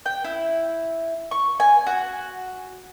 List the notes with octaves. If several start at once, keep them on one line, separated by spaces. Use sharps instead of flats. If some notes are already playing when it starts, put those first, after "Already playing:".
G5
E4
C#6
G#5
F#4